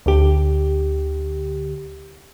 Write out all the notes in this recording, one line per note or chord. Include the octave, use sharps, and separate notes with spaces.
D2 D3 G4